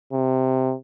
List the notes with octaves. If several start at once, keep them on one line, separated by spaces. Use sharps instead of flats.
C3